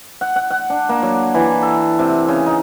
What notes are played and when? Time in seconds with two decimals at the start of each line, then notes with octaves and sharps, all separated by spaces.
0.21 F#5
0.36 F#5
0.51 F#5
0.70 D4
0.89 A#3
1.03 F#3
1.34 E3
1.62 A4
1.99 C3
2.28 C#3
2.46 D#4